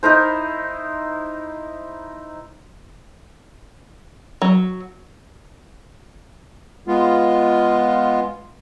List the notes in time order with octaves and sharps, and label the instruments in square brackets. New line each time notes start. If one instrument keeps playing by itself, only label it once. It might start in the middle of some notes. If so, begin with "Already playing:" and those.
[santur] D#4 E4 A#4 C5
[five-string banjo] F#3
[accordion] G#3 B3 F4